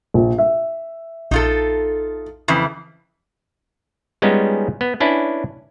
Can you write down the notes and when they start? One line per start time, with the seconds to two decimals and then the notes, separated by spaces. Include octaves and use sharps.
0.14 A#1
0.38 E5
1.31 A#1 D#4 F4 A4
2.48 F2 C#3 E3
4.22 G3 G#3 B3 C#4 D#4 F4
4.81 B3
5.00 C#4 D4 E4 B4